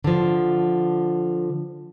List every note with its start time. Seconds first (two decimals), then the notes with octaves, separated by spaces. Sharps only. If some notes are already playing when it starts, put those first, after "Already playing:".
0.04 D3 F3